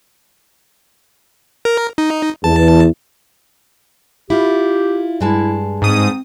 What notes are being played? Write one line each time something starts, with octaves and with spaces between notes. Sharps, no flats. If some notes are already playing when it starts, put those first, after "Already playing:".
A#4
D#4
E2 A5
E4 F4 G4
G2 G#3 E4 A5
G#2 C4 D#6